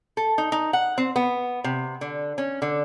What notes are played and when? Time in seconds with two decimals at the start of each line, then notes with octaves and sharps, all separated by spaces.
0.17 A4
0.38 D#4
0.52 D#4
0.73 F#5
0.98 C4
1.16 B3
1.64 C3
2.01 D3
2.38 C#4
2.62 D3